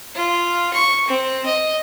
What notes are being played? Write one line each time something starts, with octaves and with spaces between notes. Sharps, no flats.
F4
C#6
C4
D#5